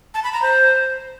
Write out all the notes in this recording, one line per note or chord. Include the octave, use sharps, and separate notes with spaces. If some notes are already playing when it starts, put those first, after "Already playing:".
A5
B5
A#5
C5